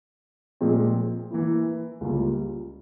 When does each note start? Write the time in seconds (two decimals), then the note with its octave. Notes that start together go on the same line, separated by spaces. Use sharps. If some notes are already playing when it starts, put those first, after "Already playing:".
0.61 A#2 F3 G#3 C4
1.31 E3 A#3 E4
2.01 C#2 C#3 G3 A#3 F4